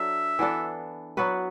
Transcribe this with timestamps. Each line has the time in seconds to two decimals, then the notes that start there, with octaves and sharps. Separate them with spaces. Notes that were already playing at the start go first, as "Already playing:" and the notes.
Already playing: F#3 D4 A4 E5
0.39 E3 B3 D4 A4
1.17 F#3 B3 F#4 B4